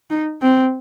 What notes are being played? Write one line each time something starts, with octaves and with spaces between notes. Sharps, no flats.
D#4
C4